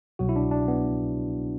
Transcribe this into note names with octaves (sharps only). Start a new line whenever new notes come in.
C2 B2 F#3 F#4
E4
D4
D4
B3